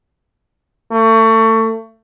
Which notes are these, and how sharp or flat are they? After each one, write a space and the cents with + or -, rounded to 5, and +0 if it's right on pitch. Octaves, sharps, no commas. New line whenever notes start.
A3 +30